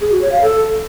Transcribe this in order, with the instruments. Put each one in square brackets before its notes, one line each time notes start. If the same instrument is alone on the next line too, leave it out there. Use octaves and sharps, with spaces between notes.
[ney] G#4
F#4
C#5
F5
A4